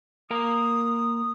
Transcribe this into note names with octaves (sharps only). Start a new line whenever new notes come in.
A#3 A#4 A#5 D#6